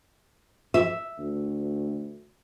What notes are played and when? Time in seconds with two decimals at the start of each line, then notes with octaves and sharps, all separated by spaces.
0.74 E5
1.18 D2